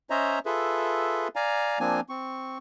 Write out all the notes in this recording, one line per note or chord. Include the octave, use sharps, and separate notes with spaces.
C#4 C5 C#5 D#5 E5 A#5
F4 G#4 A4 B4 E5
D5 F5 G#5 A#5
F3 A#3 C4 D4 G#5
C4 C#6